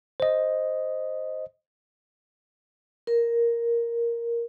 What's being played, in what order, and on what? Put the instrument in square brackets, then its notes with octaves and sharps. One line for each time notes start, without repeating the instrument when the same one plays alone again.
[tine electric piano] C5 D#5
[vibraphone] A#4